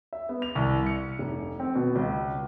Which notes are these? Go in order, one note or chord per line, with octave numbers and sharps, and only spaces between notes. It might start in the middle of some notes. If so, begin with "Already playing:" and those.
E5
B3
F7
C2
C#7
F1
C4
B2
C#2